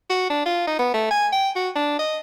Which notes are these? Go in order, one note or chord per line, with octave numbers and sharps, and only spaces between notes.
F#4
D4
F4
D#4
B3
A3
G#5
G5
F#4
D4
D#5